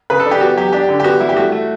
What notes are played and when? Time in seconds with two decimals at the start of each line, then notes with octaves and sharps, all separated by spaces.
0.10 C#3 B4
0.20 A4
0.26 D4
0.31 G4
0.41 B3 F#4
0.57 F#3 G4
0.73 D4 G4
0.89 D3
1.00 G4
1.04 B3 F#4
1.20 G3 E4
1.29 G4
1.36 A3 F#4
1.52 A3